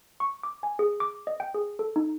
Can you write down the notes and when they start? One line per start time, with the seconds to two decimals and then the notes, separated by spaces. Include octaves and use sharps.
0.20 C#6
0.43 D6
0.63 G#5
0.79 G#4
1.00 D6
1.27 D#5
1.40 G5
1.54 G#4
1.79 A4
1.96 D#4